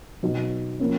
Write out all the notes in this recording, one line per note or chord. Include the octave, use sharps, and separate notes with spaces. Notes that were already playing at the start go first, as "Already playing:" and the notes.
B2 F#3 B3 D#4 F#4
F3 A#3 C#4